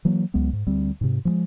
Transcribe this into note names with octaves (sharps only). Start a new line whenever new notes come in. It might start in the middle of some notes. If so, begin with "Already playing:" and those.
E3 F#3 A#3
C#2 F#3 G#3 B3
G#2
D2 G3 C4
G#2 C3
F3 G3 G#3